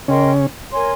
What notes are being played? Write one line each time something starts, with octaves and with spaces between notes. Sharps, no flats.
C#3 C#4 A#4 D#5 G5 C6
A#4 C#5 G#5 C6